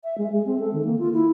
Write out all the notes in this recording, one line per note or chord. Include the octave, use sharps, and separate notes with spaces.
E5
G#3
G#3
C4
A4
D#3
A#3
F4
E4